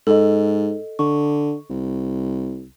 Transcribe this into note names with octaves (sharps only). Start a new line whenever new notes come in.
G#2 A4 D#5
D3 C#6
C2